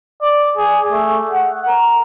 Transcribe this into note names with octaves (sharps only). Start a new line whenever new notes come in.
D5
G#4
A3
F#5
A#4